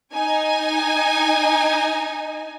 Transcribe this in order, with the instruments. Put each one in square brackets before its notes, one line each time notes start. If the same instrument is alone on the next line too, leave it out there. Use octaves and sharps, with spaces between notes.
[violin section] D#4 G#5